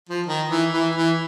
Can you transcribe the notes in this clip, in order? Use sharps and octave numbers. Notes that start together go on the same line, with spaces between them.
F3
D#3
E3
E3
E3